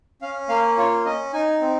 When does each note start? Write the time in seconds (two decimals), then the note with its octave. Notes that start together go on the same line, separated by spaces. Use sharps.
0.22 C#4 F5
0.49 A#3 F5
0.77 F4 C#5
1.05 C#4 D#5
1.33 D#4 G#5
1.61 C4